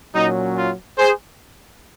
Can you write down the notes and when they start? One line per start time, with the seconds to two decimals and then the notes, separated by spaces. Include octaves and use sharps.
0.14 A#2 F#3 C#4 D#4
0.57 F4
0.98 G#4 C5